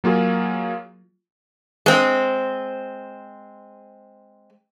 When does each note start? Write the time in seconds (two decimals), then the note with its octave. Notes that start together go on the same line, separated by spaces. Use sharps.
0.04 F#3 A#3 F4 G#4
1.86 G#3 C4